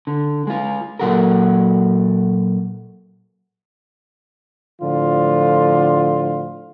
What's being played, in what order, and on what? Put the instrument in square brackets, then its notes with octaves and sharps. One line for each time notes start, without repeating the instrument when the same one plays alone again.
[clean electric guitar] D3
G#3 F4
A#2 C#3 F#3 F#4 A4 A#4
[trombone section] A2 D3 F3 F4